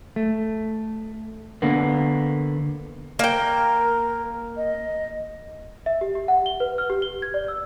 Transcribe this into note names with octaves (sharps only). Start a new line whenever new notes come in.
A3
D3 A#3 B3
A#3 A#4 G5
D#5
E5
G4
G4
F#5
G7
B4
F6
G4
G7
G#6
D5
E6